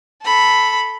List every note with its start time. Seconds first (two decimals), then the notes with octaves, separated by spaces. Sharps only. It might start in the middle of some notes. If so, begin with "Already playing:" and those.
0.23 A4 B5